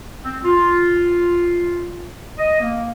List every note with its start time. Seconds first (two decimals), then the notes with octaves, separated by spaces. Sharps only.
0.23 C4
0.45 F4
2.38 D#5
2.61 A#3